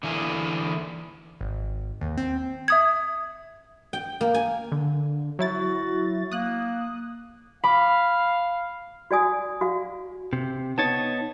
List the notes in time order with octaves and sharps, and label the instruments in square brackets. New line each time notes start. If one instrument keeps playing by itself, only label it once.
[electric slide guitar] D3 E3 A#3 E4 G#4
[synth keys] G#1
D#2
C4
[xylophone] E5 D#6 G#6
[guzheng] G5
A#3
G#5
[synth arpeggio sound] D3
[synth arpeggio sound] F#3 E4 A6 [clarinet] F#4
[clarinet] A#3 [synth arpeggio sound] D#6 F#6
[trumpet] F5 [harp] B5 D6
[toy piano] F#4 D5 G#5 D#6
F#4 F5
[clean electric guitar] C3
[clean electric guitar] B3 D#4 C#5 [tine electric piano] A5 G#6 A6